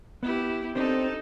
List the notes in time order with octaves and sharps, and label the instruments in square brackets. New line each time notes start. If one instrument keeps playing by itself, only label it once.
[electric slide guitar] B3 [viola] E4 G4
[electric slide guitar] C4 D4 C5 [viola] D#4 A4